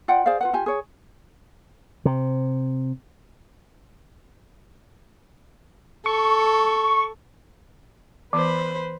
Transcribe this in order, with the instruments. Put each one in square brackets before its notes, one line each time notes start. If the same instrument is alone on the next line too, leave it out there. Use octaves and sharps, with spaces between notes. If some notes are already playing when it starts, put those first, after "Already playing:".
[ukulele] F4 D5 F#5 G5
G#4 C5 D5 F5
F4 B4 F#5
F4 G4 G#5
G#4 C#5
[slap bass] C3
[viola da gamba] A4 [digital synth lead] C#6
[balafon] E3 B3 [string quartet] B4 C5 B5